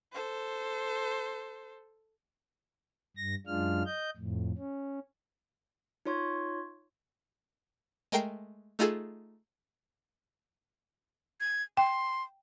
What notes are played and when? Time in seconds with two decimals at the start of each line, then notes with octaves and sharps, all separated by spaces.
0.13 A4 C5
3.17 G2 A#6
3.47 F#2 G#3 D4 F4 F6
3.86 D#5 G6
4.17 F2 A2
4.58 C#4
6.05 D#4 F4 C#5 C6 C#6 G#6
8.12 G#3 A3 A#4 G5 C7 D7
8.79 A3 D#4 F4 G#4 A4
11.40 G#6
11.77 G5 C6